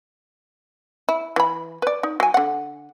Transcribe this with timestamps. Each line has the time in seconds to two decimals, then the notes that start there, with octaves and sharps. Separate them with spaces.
1.09 E4
1.36 E3 B5
1.82 B4 D5
2.03 D#4
2.20 F#3 G#5
2.34 D3 F#5